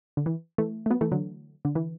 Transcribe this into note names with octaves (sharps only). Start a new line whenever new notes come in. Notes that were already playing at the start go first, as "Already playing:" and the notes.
D3
E3
E3 A3
A3
F#3 B3
E3 A3
D3 F#3
D3
E3